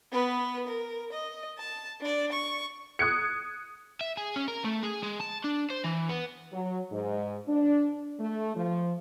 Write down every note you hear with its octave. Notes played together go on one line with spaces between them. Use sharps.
B3 B4
A#4
D#5
A5
D4 D5
C#6
D#6 F#6 G#6 C#7
E5
G#4
C#4
A#4
A3
G#4
G#3
A5
D4
C5
E3
B3
F#3
G#2
D4
A3
F3